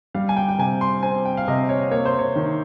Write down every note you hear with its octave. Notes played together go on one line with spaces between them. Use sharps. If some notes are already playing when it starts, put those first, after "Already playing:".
G3 F5
G#5
G5
G5
C3 G#5
C6
C4 G#5
G5
F5
C3 D#5
C#5
A#3 C#5
C5
C#5
D#3